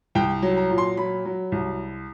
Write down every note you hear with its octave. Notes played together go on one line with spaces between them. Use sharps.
C2 G5
F#3
A#5
A#2
C6
F#3 B5
F#3
C2